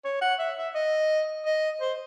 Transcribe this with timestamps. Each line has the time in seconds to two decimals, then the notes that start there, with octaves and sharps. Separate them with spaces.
0.04 C#5
0.21 F#5
0.39 E5
0.57 E5
0.75 D#5
1.45 D#5
1.81 C5